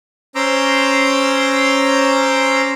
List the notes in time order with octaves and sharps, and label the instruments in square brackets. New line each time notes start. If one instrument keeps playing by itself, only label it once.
[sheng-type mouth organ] C#4 C5 A#5 C6 D6 E6